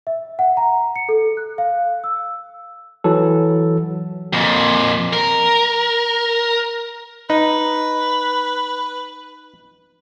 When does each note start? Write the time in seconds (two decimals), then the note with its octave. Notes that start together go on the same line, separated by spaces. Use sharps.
0.07 E5
0.39 F#5
0.57 A#5
0.96 C#7
1.09 A4
1.37 F#6
1.58 F5
2.04 E6
3.04 E3 F#3 A4
4.33 F2 A#2
5.13 A#4
7.30 D#4 B4